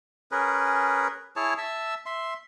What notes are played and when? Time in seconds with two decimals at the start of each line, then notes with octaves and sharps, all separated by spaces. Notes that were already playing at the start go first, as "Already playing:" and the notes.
0.32 C#4 G#4 A#4 B4
1.36 E4 G#4 C#5 A5
1.58 E5 A5 E6
2.06 E5 C6